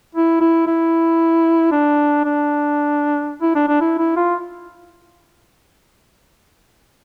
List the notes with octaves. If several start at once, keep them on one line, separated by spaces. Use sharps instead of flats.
E4
E4
E4
D4
D4
E4
D4
D4
E4
E4
F4